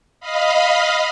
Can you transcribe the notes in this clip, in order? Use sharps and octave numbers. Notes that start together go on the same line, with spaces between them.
D#5 F5 B5